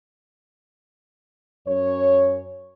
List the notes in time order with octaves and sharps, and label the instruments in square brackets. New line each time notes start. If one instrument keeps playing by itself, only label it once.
[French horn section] F#2 C#5